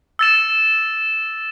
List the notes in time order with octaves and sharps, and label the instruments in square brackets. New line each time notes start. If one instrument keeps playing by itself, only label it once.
[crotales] E6 A6 E7